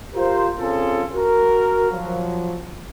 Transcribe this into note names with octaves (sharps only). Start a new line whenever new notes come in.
F4 G4 A#4 C5
C4 C#4 F4 G#4 A4
F#4 A#4
F3 F#3